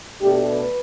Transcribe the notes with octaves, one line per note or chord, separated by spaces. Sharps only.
B2 A3 D4 G4
B4